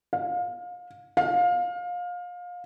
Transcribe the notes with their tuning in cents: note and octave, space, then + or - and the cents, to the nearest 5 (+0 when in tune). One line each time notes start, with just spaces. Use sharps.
F5 +30
F5 +25